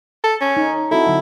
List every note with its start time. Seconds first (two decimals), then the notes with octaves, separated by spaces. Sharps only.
0.23 A4
0.41 C#4
0.57 D#4
0.91 C4 E4 F#4 A4
1.07 D3 F#3